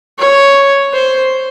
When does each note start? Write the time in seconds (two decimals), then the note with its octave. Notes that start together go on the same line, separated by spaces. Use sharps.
0.19 C#5
0.93 C5